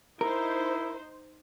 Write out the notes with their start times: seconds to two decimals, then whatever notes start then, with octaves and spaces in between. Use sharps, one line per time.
0.21 D#4 E4 A#4 C5